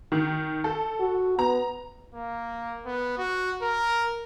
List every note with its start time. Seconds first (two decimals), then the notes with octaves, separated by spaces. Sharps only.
0.12 D#3
0.64 A4
1.00 F#4
1.39 B3 A#5
2.15 A#3
2.85 B3
3.18 F#4
3.62 A#4